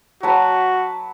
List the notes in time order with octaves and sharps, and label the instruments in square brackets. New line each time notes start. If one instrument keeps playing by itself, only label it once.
[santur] F#3 B4 A5 [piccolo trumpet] F#4